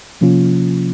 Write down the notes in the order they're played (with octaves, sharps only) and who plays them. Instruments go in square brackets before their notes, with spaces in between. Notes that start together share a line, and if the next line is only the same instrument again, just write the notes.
[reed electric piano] C3 F3 A#3 C#4 F4